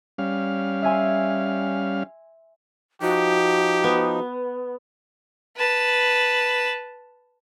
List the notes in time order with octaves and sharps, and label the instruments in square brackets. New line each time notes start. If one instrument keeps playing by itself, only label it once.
[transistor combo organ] G3 C#4 F5
[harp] E5 G#5 C6
[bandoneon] F3 D#4 [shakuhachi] F#4 [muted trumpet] G4
[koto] B3
[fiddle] B4 A5